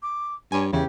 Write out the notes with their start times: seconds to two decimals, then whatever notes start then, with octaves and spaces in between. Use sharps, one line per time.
0.02 D6
0.52 G2 C#5 G#5
0.73 E2 C#3 E3 G4